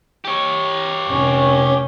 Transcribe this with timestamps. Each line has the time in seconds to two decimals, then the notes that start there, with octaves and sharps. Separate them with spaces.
0.25 G4 C#5
1.08 F1 C#4